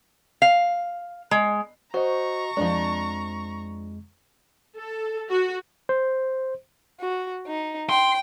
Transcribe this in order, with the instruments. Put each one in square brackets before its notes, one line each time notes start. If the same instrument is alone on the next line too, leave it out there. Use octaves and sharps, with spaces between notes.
[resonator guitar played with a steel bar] F5
G#3
[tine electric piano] F#4 D#5 [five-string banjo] C5 [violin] A#5 C#6
[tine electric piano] F2 G#3 [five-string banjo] F3 D4
[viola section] A4
F#4
[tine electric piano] C5
[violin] F#4
D#4
[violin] G5 [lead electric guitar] C6